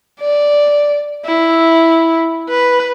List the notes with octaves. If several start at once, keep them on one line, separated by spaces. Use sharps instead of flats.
D5
E4
B4